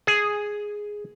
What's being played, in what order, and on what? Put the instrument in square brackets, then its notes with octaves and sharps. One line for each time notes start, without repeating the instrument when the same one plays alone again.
[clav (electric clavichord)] G#4